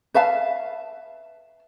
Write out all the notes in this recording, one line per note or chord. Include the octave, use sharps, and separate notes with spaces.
B4 E5 F5 A5